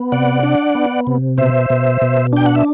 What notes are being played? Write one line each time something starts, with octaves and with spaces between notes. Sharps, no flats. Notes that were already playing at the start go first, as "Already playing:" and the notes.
Already playing: B3
C3 D5 F#5
D4
B3
C3
B2 C5 E5
B2
B2
D4 G5
F#5
E5